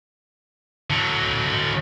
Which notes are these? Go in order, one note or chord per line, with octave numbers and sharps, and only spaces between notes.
D3 F#3